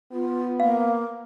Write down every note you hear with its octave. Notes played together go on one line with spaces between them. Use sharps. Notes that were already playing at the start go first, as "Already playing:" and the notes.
B3 F4
A#3 F5